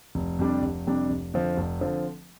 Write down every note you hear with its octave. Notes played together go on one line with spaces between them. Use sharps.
F1
F2 C3 G3 D4
F1
F2 C3 G3 D4
F1
F2 D3 F3 C4
F1
D3 F3 C4